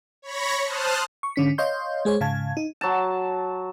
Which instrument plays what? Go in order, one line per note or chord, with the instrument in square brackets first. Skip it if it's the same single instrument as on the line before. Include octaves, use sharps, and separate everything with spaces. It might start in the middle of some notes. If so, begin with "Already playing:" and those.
[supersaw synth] C#5 B5 C#6 A#6
C5 A5 D#6 F6 F#6
[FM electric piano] C#6
G#2 D3 C#4 B6
C#5 D#5 F5 C6 G6
G#3 G#4 C5 C#5
G#2 C#3 F5 A5 G#6
D#4
[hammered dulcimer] F#3 A5